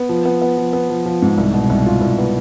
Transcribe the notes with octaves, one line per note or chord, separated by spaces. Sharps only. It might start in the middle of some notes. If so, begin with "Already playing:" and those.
Already playing: B3
F3
B3
B3
F3
B3
F3
F3
G#2
C2
B2
C2
F4
C2
B3